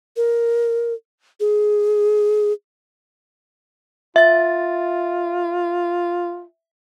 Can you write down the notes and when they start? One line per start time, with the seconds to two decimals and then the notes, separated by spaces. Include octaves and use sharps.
0.16 A#4
1.40 G#4
4.16 F4 E5 A6